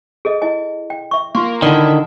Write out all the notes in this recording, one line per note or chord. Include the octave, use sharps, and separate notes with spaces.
G#4 A4 D#5
E4 D#5 G#5
G5
E5 C#6
A#3 F4 C6 C#6
D3 D#3 E4 D5